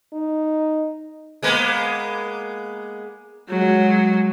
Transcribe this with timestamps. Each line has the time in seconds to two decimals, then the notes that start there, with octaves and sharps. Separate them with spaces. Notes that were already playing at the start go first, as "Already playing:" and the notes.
0.13 D#4
1.43 G#3 A#3 B3
3.49 F#3 G#3